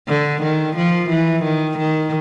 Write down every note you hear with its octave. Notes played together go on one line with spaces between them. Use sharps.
D3
D#3
F3
E3
D#3
D#3